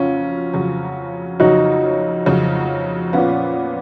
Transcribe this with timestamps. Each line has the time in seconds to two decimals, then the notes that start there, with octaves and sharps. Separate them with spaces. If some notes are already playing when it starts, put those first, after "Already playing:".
Already playing: F2 C#3 F#3 C#4 F4
0.53 F2 C#3 F#3
1.40 F2 C#3 F#3 D#4 F#4
2.26 F2 C#3 F#3
3.13 A#2 F3 B3 C#4 F4